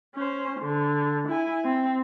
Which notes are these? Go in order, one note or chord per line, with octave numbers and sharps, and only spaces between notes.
C#4 C5
D3
E4 G#5
C4